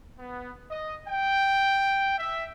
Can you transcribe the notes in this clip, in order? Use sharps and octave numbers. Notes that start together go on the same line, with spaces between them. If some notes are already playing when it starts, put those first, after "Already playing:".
B3
D#5
G5
E5